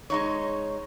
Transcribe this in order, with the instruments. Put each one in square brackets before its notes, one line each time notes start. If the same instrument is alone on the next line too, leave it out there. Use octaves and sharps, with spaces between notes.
[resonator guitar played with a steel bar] G#3 D#4 C#5